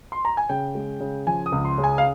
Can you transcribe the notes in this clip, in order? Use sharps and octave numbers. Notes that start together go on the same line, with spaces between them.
C6
A#5
G#5
C#3 G5
G#3
C#3
F3 G#5
D#6
C#2
C6
C#3
G#5
F5